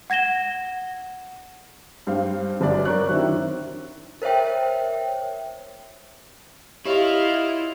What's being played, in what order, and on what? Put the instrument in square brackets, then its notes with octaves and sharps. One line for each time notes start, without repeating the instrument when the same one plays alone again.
[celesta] F#5 G#6 A#6 E7 G7
[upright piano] G2 C5 F5
G1 F#2 D5
A#4 C#5 D5 C#6 F#6
D#3 F#3 C4 D4 E4
[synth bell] A#4 C5 C#5 E5 G5
[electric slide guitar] E4 [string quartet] F4 D#5 F5 [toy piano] G4 C#5